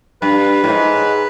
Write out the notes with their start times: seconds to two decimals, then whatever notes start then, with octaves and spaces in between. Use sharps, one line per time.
0.22 G2 B4
0.64 A2
0.69 G#2